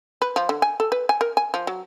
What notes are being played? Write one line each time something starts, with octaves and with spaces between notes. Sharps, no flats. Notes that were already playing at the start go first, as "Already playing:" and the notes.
B4
F3
D3
G#5
A4
B4
G#5
A#4
G#5
F3
F#3